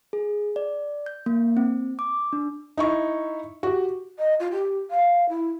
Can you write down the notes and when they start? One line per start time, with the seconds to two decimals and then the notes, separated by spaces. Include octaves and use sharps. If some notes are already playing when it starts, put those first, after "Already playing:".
0.13 G#4
0.56 D5
1.06 G6
1.26 A#3
1.57 C4
1.99 D6
2.33 D4
2.78 D#4 E4 C#6
3.63 F#4 G4
4.19 D#5
4.40 F4
4.52 G4
4.91 F5
5.29 E4